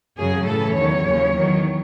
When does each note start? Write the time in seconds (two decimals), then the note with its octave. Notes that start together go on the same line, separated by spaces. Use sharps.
0.17 F#2 C#3 F#3 G#4
0.46 A2 E3 A4
0.76 E2 D#3 F#3 C#5
1.05 D#2 C#3 F#3
1.34 E2 D#3 F#3